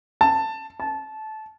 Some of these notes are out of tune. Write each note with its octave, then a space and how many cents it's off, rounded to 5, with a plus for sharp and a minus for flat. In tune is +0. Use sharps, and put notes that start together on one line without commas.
A5 +10
A5 -20